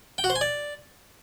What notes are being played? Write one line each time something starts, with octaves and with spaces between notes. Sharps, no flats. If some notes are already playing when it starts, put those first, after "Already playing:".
G5
F#4
C5
G#5
D5